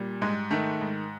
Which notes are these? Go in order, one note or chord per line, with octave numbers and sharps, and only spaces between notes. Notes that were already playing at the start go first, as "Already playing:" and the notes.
Already playing: A#2 G3
G#2 G#3
D#3 A3
G#2